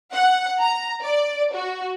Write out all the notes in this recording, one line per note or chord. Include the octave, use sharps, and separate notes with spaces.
F#5
A#5
D5
F#4